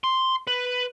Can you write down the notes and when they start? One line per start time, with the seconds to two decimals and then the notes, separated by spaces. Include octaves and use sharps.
0.04 C6
0.47 B4